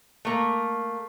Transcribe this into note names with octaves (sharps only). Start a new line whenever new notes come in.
A3 A#3